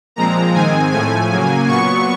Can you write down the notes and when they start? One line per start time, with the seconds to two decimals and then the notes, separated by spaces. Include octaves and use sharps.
0.16 A#2 F3 G#3 C4 A#5
0.54 G#2 D#3 G#3 C4 G#5
0.91 A2 F3 A3 G#5
1.30 C#3 F#3 A#3
1.67 A#2 F#3 B3 C#6